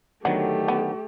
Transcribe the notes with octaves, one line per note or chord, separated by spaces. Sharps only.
D3 D#3 F#3 A3 B3 G4
B3